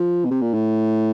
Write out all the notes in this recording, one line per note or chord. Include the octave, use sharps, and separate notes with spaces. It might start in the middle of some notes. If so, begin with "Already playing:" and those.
Already playing: F3
B2
C3
A#2
A2